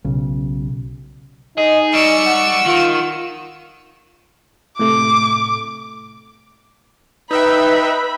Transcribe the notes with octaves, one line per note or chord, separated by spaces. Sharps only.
B1 C#3
D#4 G#4 D#5
G3 D#5 C#6 E6
F#5
D#3 F4
A2 C3 A3 D6
D#4 B4 E5 G5 B5